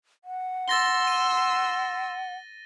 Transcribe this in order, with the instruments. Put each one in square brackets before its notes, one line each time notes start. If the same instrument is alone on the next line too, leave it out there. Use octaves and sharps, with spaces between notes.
[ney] F#5
[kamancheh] C6 E6 [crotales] A6 A#6 G7
[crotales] D#7